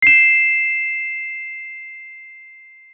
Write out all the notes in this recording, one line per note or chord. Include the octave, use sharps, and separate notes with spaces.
C7 E7